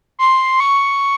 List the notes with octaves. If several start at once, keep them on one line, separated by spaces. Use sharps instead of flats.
C6
C#6